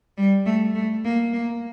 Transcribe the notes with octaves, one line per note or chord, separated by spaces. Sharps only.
G3
A3
A3
A#3
A#3